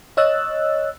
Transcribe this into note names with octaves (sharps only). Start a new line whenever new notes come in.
C#5 D#5 E6 F#6 A6